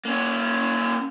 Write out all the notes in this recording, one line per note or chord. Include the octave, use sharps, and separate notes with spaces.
A#3 C#4